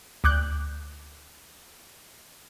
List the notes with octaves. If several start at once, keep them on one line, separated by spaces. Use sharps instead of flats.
D2 D6 F#6 G6